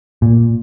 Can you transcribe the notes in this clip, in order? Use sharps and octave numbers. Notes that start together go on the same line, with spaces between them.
A#2